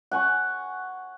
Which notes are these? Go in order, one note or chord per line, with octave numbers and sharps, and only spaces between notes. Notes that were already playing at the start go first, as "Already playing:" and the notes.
F#5 G#5 C#6